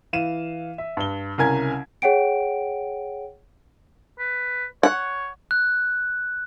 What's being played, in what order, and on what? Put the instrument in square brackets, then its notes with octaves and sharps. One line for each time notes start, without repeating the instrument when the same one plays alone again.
[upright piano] E3 F5 D#7 E7
E5
G2 G7
C2 C#3 A#4 G#5 G#6
[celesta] G#4 C#5 F#5 G5 D7
[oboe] B4
[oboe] C#5 [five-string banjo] F#5
[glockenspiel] F#6